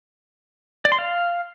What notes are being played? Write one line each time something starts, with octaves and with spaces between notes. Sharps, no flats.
D5
C6
F5